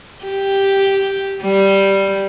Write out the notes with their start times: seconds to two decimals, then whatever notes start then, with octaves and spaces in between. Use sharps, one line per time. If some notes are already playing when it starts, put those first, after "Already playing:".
0.24 G4
1.42 G3